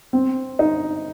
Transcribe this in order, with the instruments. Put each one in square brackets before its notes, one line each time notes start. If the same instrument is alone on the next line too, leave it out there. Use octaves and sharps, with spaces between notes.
[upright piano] C4
D#4